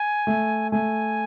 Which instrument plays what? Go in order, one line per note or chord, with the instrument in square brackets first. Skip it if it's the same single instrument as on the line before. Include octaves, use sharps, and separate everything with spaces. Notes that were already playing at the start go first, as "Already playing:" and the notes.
Already playing: [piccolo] G#5
[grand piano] A3
[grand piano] A3 [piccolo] G#5